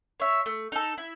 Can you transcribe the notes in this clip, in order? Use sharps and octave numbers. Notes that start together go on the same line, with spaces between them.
C#5 E5
A3
D#4 A4
E4